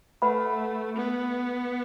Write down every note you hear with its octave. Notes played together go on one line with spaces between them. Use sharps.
A3 B4 F#5 B5
B3